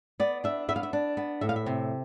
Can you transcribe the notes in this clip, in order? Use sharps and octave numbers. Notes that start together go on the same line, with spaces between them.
B3 D5
D4 E5
B3 E5
F5
E5
D4
B3
A2 E5
F5
E5
C3